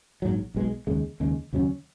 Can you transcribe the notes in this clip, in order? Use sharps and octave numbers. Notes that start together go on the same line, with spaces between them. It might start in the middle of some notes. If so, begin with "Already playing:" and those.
A#1 G#2 F#3
B1 B2 G#3
D#2 C#3 G#3
D#2 C#3 G#3
D#2 C#3 F#3 C#4